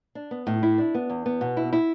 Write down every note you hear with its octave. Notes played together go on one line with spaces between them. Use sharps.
D4
B3
A2
E4
D4
B3
E2
B3
B2
E4
E4